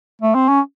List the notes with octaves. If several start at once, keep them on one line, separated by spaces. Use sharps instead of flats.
A3
C4
C#4